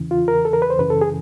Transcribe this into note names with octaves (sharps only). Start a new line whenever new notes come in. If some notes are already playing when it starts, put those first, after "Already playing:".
Already playing: E2 C#3 E3
F4
A#4
A4
A#4
B4
C5
F#2 C#3 E3 B4
A4
G#4